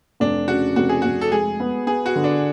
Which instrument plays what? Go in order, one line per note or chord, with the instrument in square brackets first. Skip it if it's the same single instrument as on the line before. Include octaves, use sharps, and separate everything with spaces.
[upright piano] F1 [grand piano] D4
[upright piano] C#3 [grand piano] F#4
[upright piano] F1 [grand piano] F#4
[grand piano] G#4
[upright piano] F1 [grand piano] F#4
[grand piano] A4
[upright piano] G#3 [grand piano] G#4
[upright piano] B3
[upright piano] B3 [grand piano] G#4
[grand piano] F#4
[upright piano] D3
[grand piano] D4